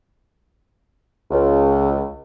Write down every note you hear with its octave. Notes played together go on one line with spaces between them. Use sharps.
C#2